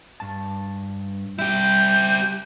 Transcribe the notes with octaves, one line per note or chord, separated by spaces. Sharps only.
G2 A5
G3 E4 G4 G6